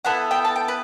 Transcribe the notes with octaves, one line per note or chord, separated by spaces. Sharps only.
B3 E4 A4 F#5
G5
A5
G5
B4